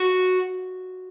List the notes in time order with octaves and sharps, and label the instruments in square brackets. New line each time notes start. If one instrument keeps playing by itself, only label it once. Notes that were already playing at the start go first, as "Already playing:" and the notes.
Already playing: [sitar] F#4